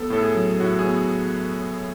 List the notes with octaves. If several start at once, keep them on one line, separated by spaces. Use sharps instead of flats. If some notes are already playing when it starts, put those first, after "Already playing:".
Already playing: B3 A4
A2 A4
G#4
F#3
A2 F#4
G#4
B3